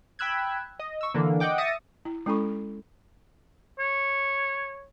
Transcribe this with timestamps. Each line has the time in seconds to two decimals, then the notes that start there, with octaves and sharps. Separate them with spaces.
0.19 G5 B5 E6 F#6 G#6
0.79 D#5
1.01 C#6 E6
1.14 D3 E3 A#3
1.40 D#5 F#5 G5 D6
1.58 E5 D#6 A6 A#6 C#7 D#7
2.05 E4
2.26 G#3 C#4 E4 A4 B5 C#6
3.79 C#5